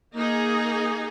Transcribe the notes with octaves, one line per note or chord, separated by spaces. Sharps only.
A#3 D#4 G#4